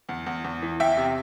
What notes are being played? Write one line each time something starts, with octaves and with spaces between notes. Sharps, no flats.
E2
E2
E2
E3
E2 E5 G5
C3